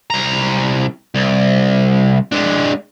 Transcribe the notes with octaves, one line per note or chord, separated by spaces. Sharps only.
C2 A#5
C2
G#3 D4